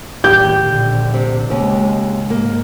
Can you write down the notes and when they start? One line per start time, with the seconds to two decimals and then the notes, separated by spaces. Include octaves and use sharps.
0.24 A1 D#2 G4 G6
0.60 A#1 D3
1.14 C3
1.50 D#2 C#3 G#3 C#4
2.30 G#2 A#3